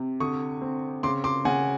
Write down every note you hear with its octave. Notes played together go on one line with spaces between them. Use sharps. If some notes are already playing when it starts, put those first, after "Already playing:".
Already playing: C3
D3 C#6 D#6
C4
C#3 C6 D6
C6 D6
C#3 F#5 G#5